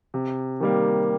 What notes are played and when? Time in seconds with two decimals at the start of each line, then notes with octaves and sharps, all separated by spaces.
0.14 C3
0.60 D#3 G3 A#3